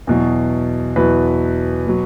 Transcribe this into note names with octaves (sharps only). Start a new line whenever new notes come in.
E2 B2 F#3
E2 B2 F#3 B4
B2 F#3